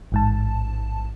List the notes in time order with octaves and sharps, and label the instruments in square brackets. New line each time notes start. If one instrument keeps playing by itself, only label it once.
[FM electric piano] A1 G#2 A5